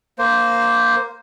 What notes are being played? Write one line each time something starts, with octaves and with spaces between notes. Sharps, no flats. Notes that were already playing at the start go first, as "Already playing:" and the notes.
A#3 C5